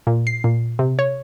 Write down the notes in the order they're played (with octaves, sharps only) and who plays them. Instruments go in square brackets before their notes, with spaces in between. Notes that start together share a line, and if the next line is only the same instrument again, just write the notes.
[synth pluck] A#2
C7
A#2
C3
C#5